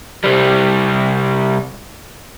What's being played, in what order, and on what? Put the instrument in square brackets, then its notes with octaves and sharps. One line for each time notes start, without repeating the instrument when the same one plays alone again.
[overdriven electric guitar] C3 G3